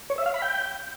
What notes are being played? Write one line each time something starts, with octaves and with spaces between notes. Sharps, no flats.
C#5
E5
F5
B5
G5